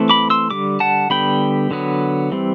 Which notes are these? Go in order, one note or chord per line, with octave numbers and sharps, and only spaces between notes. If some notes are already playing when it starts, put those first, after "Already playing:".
Already playing: E3 A3 C4
B5 D6
C6 E6
D3 G3 D6
F#5 A5
D3 G3 B3 G5 B5
D3 F#3 B3
E3 G3 C4